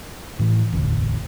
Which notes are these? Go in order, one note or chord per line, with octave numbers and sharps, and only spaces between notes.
A2 E3
E1 A1 D2 C3